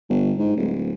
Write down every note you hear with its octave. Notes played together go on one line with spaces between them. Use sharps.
G1
G#2
D1